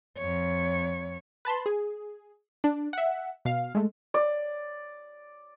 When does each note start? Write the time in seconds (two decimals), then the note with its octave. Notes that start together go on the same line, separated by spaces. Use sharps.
0.18 F2 C#5
1.45 B4 A5 B5 C6
1.66 G#4
2.64 D4
2.93 E5 F#5
3.45 B2 F5
3.75 G#3 A3
4.14 D5